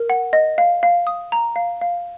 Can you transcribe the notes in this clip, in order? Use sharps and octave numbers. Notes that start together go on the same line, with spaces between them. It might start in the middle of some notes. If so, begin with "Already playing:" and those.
Already playing: A#4
F#5
D#5
F5
F5
D#6
A#5
F5
F5